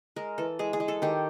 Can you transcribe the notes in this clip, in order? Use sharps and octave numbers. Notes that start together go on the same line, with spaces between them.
G#3 A#4
E3 A4
G#3 G#4
G#4
G#3
A4
D#3 G4